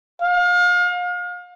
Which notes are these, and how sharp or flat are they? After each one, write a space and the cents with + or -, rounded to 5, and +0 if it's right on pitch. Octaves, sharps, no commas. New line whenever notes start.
F5 +35